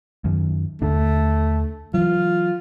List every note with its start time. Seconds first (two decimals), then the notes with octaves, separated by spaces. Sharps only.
0.25 F#2 D#3
0.82 D#2 D3 A3 D4
1.94 E3 F#3 F4